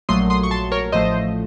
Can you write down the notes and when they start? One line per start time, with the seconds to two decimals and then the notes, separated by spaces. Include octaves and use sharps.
0.09 A#1 A#2 F#3 A3 C6 D#6
0.30 C6 D#6
0.43 C#6
0.51 A5 C6
0.72 A#4 C#5
0.92 A1 A2 F3 A3 C5 D#5